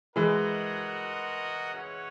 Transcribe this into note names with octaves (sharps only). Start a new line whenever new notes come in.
E3 G#3 F#4 A#4 D#5 F#5
C#4 F#4 C#5 F#5